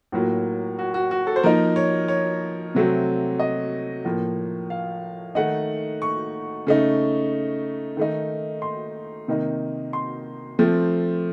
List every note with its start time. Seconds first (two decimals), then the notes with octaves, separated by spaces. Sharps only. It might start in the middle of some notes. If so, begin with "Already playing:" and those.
0.12 A2 F#3 A#3 F4
0.79 F#4
0.94 F#4
1.11 F#4
1.27 A4
1.36 C5
1.43 F3 A#3 D#4 A#4
1.76 C#5
2.08 C#5
2.75 C3 F#3 A3 C4
3.40 D#5
4.05 A2 F3 A#3
4.70 F5
5.35 D#3 A3 D#4 F#5
6.02 C#6
6.67 C#3 A3 D#4
7.97 D#3 A3 D#4
8.62 C6
9.28 C3 D#3 A#3 D#4
9.93 C6
10.59 F3 A3 C4